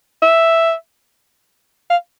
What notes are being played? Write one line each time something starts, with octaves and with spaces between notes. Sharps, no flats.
E5
F5